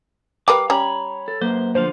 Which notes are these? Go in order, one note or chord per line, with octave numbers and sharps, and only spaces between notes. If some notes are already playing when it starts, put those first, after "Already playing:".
G3 A#4 B4 F5 D6
G3 C#4 C#5 A#5 B5
A4
F#3 A#3 B4 C5
D3 F3 C5 F5